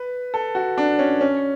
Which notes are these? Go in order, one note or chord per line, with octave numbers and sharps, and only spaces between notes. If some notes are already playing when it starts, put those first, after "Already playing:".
Already playing: B4
A4
F#4
D4
C#4
C#4